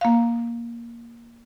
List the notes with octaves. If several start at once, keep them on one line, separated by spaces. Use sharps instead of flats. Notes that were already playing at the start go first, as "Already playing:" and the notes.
A#3 F5